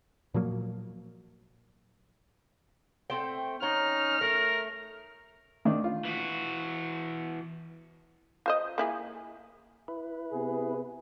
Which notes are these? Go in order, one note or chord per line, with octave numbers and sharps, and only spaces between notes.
A#2 F3 F#3 A#3
A3 C4 G5
C#4 D#4 A#5 F6
A3 A#4
D#3 A3 D4
F4
E3 F#4
F4 C5 D#5
A#3 E4 G#4
E4 B4
C3 B3 G#4